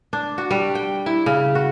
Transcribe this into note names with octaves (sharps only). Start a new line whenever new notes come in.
D4
F#4
G3
G5
E4
C#3
F#4